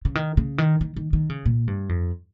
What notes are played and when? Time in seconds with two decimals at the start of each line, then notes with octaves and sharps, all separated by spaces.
0.05 C#3
0.15 D#3
0.37 C#3
0.58 D#3
0.81 D#3
0.96 D#3
1.13 D#3
1.30 C#3
1.45 A#2
1.67 G2
1.89 F2